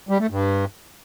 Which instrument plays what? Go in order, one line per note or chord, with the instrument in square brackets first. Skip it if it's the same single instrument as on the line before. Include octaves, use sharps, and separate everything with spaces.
[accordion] G3
A3
G2